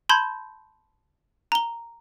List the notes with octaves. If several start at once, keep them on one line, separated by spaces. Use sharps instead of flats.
A5 B5 C6 G6 G#6
A#5 G7